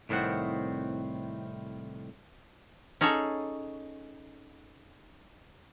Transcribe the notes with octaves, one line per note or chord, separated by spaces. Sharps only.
C2 A2 D#3 C4 F#5
C#4 D#4 G#4 A4 C#5